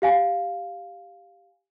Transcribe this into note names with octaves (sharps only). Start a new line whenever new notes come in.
G4 F5 G#5